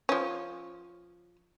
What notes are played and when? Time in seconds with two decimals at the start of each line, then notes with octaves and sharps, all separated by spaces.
0.09 F3 C#4